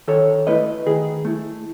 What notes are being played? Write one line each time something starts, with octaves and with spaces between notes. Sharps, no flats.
D#3 A4 C#5
A3 E4 B4 D#5
D#3 G#4
A3 E4